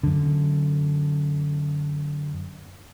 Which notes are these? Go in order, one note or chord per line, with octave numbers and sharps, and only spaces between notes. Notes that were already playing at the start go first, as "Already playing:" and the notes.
F#2 D3